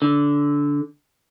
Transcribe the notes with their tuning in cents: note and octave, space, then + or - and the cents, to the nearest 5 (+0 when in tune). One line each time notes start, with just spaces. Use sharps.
D3 -15